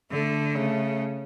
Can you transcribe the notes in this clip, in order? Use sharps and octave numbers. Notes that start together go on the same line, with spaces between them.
D3 A3
C#3 A3